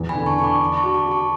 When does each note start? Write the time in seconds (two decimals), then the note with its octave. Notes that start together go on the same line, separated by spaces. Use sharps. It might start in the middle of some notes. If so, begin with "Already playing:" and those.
Already playing: E2
0.09 G#5 B5
0.15 D3
0.26 A5 C#6
0.37 D3 C#6
0.43 B5 D6
0.60 D4
0.77 A5 C#6
0.84 F#4
0.95 B5 D6
1.06 F#4
1.11 A5 C#6